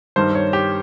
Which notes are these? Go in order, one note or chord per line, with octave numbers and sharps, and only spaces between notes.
G2 D#3 G3 C5
C#5
G4